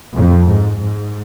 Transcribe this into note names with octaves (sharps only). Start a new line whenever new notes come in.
F2
G#2
G#2